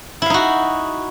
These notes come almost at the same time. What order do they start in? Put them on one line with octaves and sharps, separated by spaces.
E4 F5 D#4 F#4